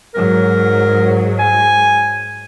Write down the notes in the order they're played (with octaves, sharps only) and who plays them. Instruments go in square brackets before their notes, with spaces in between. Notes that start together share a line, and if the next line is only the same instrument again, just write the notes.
[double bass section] G#2 F#3 [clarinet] A#4
[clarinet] G#5